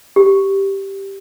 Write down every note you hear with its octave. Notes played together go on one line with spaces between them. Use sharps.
G4